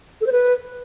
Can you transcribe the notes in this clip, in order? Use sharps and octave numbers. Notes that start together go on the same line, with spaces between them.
A4
C5
B4